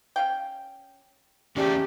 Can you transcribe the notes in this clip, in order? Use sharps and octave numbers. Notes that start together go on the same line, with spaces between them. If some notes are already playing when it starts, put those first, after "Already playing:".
C#4 F5 G5
E2 G#3 A3 C#4 G4 D5